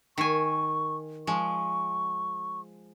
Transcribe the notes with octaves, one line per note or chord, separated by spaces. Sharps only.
D#3 G#5 C#6
F3 G#3 C#6